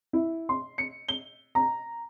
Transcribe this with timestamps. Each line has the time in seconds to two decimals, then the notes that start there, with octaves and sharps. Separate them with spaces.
0.13 E4
0.49 C6
0.78 C#7
1.08 G7
1.55 A#5